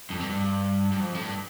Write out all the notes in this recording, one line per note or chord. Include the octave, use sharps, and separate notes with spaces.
F2
G2
G2
G2
F2
A2
G2